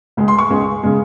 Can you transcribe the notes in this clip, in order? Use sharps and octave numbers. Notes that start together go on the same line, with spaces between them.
C#2 C#3 G#3
C6
C#6
C#2 C#3 G#3
C#3 G#3